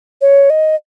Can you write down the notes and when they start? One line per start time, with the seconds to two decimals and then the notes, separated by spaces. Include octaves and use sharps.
0.21 C#5
0.50 D#5